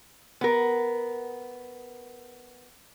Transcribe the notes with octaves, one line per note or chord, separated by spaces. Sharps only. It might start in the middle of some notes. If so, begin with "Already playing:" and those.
B3 A#4